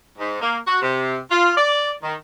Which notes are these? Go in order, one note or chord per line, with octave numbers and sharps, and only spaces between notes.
G#2
A#3
F#4
C3
F4
D5
D#3